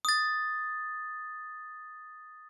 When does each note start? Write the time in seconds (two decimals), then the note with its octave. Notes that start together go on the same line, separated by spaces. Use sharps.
0.05 D#6 A6